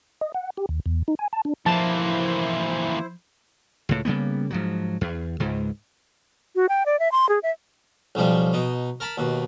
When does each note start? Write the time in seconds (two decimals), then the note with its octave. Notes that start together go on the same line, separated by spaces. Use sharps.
0.21 D#5
0.35 F#5
0.57 G4
0.69 D#2
0.86 E2
1.08 D#4
1.19 G#5
1.33 A5
1.45 D4
1.66 E3 F3 A#3 E4 C5 A5
3.89 C#2 A2
4.05 C#3 G3 A#3 B3
4.50 G#2 F3 F#3
5.01 E2
5.40 C#2 G#2
6.56 F#4
6.69 G5
6.86 D5
6.99 E5
7.12 C6
7.29 G#4
7.43 E5
8.15 B1 C#3 F3 G3
8.53 B2 D#4
9.00 A#4 A5 B5
9.18 D#2 B2